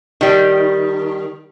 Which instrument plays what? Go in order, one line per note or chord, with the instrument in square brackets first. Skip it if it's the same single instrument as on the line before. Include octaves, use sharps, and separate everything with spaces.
[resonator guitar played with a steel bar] D#3 G3